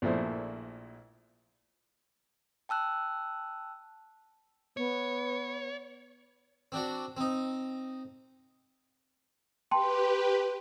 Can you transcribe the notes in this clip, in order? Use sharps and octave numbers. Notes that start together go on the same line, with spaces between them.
A#1 A#2 F3 A3 E4 C5
G5 A5 E6 F#6
B3 C#5
C4 D4 F#4
C4 D#4
G4 B4 G5 A5 C6